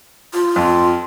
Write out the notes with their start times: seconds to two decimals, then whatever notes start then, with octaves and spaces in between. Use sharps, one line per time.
0.33 F4
0.56 F2